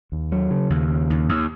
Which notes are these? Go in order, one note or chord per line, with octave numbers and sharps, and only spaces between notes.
D#2
F#3
C#3
D#2
C#3
D#2
D#2